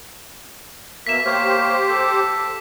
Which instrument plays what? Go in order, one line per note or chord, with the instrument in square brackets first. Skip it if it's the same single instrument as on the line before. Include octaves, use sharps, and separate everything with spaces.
[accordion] B2 A#3 E5 [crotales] B6 E7
[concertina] A#3 C#5 F6 [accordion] G4 C5
[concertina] A4 D6